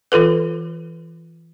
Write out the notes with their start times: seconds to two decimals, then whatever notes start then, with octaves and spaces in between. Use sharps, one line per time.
0.12 E3 F4 A4 B4